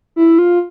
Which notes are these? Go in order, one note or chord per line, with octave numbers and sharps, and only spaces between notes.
E4
F4